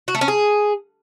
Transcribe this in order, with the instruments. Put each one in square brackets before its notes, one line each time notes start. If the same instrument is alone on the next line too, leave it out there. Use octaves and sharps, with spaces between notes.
[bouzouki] F#4
A3
C#4
G#4